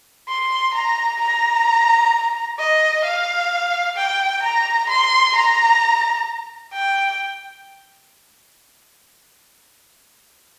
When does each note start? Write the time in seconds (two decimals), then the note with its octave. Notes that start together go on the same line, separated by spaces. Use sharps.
0.28 C6
0.74 A#5
1.20 A#5
2.58 D#5
3.04 F5
3.97 G5
4.43 A#5
4.89 C6
5.35 A#5
6.73 G5